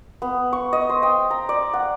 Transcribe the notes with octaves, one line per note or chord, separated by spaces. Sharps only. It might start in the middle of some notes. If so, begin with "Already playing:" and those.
B3
C#6
D#5
C5
G5
A#5
D5
F#5